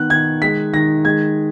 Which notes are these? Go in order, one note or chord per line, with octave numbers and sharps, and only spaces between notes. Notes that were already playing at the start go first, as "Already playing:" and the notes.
Already playing: D#3 B3 F#6
D#3 G#6
G#3 B6
D#3 A#6
G#3 G#6